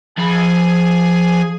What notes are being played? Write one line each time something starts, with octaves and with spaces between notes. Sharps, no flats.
F3 G#4 G#5 B5